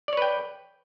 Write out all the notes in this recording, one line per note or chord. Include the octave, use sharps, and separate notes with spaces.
B4 C#5 D5 G5